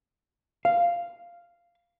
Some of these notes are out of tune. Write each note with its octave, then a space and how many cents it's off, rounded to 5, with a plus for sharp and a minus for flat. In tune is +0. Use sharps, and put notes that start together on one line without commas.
F5 -5